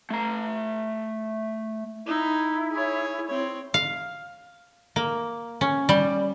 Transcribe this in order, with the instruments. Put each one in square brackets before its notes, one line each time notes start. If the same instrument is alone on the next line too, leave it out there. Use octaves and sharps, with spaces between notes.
[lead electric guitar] A3 A#5
[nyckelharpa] D#4 [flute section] E4
[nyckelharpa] G#4 C#5
C4 C#5
[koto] F5
A#3
C#4
G3